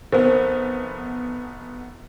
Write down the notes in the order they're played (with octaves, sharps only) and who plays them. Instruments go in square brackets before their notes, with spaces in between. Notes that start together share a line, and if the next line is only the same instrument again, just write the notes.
[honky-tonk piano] F1 B3 [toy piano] A#4 C5